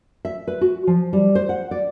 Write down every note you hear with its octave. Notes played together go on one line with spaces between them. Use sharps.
E5
B4
F#4
F3
G3
C5
F#5
D5